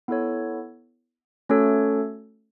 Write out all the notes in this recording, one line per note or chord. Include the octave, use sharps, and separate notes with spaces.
B3 E4 A4 C#5
A3 C#4 F#4 A4 C#5